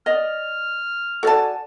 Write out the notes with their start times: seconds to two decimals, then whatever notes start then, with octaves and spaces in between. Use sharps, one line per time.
0.06 D5 D#5 F6
1.23 F#4 A4 D5 G#5 A5